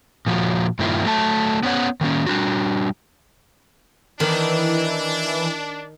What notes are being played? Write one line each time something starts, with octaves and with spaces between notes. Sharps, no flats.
A#2 F3 F#4
G2 A#2 D#3 A#3 E4 F4
F#3 A3 A4 A5
B3 C#4 C#5 F#5
D#3 A#3 C#4
G3 D4 F#4
D#3 E3 D4